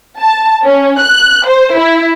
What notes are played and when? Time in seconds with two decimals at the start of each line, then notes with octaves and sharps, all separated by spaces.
0.19 A5
0.64 C#4
0.99 F#6
1.47 C5
1.76 E4